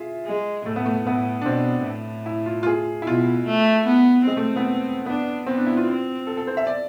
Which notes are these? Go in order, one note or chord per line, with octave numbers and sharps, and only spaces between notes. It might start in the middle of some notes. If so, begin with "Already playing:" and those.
Already playing: F4 G#4 E5
G#3
A2 A3
B3
A3
A2 B3
D4
B2 C4
A2
E4
F4
F4
G#4
E4
B2 F4
A3
B3
G#3 C4
A3
B3
B3 D4
B3 C4
D4
E4
F4
C4
A4
A4
C5
E5
D5